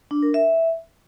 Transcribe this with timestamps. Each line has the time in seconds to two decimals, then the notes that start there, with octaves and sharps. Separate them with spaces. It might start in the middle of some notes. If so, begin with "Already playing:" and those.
0.11 D4
0.23 A#4
0.34 E5